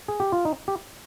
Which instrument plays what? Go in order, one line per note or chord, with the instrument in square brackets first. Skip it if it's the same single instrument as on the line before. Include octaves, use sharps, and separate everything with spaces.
[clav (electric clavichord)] G#4
G4
F4
D#4
G4